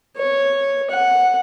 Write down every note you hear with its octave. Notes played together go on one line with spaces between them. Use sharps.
C#5
F#5